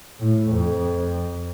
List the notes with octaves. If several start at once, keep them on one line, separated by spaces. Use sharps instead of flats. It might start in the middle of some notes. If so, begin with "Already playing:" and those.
A2
F2